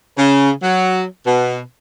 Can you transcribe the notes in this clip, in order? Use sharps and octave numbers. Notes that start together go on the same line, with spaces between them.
C#3
F#3
B2